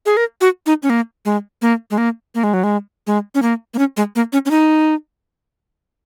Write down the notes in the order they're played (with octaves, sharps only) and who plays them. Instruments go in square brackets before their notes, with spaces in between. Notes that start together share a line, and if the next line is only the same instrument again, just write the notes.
[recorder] G#4
A#4
F#4
D#4
C#4
A#3
G#3
A#3
G#3
A#3
A#3
G#3
F#3
G#3
G#3
C#4
A#3
A#3
C#4
G#3
A#3
C#4
C#4
D#4